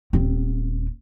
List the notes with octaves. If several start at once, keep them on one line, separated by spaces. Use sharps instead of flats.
D#1 C4